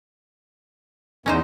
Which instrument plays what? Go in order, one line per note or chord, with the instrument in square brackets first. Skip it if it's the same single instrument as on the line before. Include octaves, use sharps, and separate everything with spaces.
[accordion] E2 [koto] C#4 D#4 C5